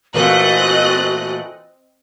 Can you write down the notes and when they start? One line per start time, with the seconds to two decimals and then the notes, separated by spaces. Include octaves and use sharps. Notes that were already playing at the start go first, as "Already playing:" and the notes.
0.14 A#2 E3 A3 C4 F#4 D#5 F#6